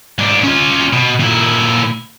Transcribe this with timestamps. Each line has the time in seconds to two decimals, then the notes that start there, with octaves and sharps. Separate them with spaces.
0.19 G#2 D4
0.44 C#4 F4
0.93 B2
1.20 A#2 E4